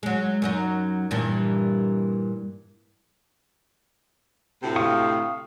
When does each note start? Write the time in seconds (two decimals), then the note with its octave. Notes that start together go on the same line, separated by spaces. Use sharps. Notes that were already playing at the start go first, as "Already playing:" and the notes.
0.03 F#3 G#3
0.42 F#2 F#3 D#4
1.11 G2 A#2 E3
4.63 D2 A2 C3
4.76 F5 C#6 D#6